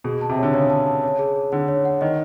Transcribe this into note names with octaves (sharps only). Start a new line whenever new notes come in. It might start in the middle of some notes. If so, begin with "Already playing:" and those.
B2 G#4
A5
C3
D3 C#5
C#3 C#5
A5
A5
C#5
G#4
G#4
D3 F#5
C#5
F#5
D#3 D#5